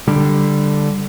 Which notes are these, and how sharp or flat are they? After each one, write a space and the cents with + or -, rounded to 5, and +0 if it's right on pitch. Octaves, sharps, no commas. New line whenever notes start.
D3 +0 G3 +0